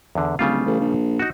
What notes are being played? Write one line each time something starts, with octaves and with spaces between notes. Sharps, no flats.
E2 D3
D1 C#3 G3 F4
A1
A#1
D#4 F#4